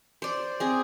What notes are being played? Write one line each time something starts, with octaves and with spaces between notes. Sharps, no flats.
C5 D5
C4 G#4